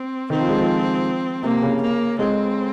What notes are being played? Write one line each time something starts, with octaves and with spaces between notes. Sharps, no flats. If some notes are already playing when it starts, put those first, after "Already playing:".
Already playing: C4
D#3 C4
F3
G#3
F3
C3 A#3
C#3
A#3
G#3 C4